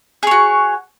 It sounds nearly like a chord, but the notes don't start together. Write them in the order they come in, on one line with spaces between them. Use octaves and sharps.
G#4 C#5 F#4